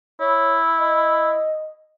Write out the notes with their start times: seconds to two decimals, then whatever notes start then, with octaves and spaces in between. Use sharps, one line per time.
0.20 E4 C#5
0.79 D#5